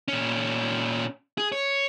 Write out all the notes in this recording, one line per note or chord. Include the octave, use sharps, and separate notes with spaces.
A#2 C#4
G#4
C#5